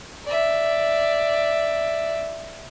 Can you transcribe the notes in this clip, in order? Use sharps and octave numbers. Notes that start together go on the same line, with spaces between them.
D5 E5